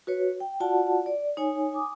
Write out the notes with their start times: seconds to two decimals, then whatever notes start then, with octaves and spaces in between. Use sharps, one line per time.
0.07 F#4 B4 C#5
0.40 G5
0.60 F4 F#4 D5 F#5 A5
1.06 D5
1.37 D#4 C#5 G#5
1.73 G#5 D6 D#6